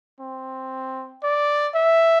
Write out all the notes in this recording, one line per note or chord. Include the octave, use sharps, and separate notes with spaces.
C4
D5
E5